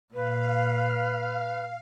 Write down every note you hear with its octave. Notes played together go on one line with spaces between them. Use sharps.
A#2 B4 F5